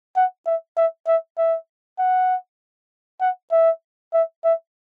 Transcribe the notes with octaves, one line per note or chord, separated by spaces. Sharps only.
F#5
E5
E5
E5
E5
F#5
F#5
E5
E5
E5